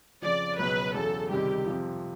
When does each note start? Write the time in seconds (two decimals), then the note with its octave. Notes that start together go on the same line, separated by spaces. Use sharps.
0.22 F2 C#3 F3 D5
0.58 C#2 B2 F#3 B4
0.94 E2 C#3 F#3 A4
1.30 C#2 C3 D#3 G3 G4
1.66 F2 C3 F3